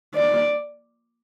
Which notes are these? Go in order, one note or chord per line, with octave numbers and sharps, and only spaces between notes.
D5